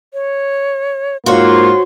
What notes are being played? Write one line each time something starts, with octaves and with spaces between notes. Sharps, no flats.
C#5
G#2 A#3 F4 F#4 C5 C#5 C6